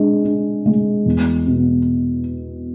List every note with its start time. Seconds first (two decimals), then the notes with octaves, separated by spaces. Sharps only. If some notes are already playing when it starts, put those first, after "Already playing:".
Already playing: G#3 D4
0.24 D4
0.66 G#3
1.06 E2
1.47 B2